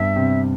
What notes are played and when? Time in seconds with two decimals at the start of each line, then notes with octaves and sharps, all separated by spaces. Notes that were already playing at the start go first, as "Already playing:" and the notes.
Already playing: G2 B3 E5
0.16 C3